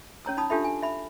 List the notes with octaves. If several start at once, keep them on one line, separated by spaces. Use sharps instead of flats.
C#4 C#5 A#5 E6
D#4 A5 B5 D#6
D4 F4 G4 A4 E5 B5
G#5
E5 B5